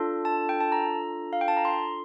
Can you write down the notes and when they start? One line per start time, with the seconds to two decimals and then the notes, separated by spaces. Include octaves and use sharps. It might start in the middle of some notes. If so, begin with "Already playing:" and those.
Already playing: D4 F4 A4
0.25 A5
0.49 G5
0.60 A5
0.72 A#5
1.33 F5
1.41 G5
1.48 A5
1.57 A#5
1.65 C6